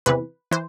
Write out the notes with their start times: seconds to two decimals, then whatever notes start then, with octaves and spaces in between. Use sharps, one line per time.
0.06 E2 C3 E3 B4
0.51 E3 C5